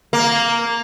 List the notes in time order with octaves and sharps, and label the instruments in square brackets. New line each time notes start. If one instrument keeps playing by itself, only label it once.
[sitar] A#3